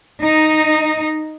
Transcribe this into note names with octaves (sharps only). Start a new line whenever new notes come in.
D#4